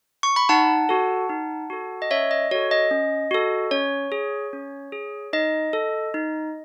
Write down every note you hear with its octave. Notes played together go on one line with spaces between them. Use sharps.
C#6
B5
D#4 F#5 A5
F#4 A4
D#4
F#4 A4
D#5
C#4 C#5 E5
D#5
F#4 A4 C#5
D#5
C#4
F#4 A4
C#4 C#5
G#4
C#4
G#4
D#4 D#5
A4
D#4